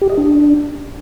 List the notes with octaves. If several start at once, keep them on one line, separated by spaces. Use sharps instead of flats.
G4
D#5
D4